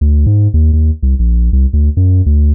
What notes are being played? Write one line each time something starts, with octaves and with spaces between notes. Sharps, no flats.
D2
G#2
D#2
D#2
C2
A#1
C2
D2
F#2
D2